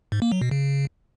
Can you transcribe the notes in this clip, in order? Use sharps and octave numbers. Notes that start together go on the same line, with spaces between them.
G#2
A#3
F#3
B2
C#3